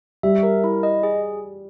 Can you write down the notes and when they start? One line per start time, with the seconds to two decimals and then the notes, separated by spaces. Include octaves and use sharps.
0.23 G3 E5
0.43 A#4
0.64 E4
0.83 D#5
1.03 G#4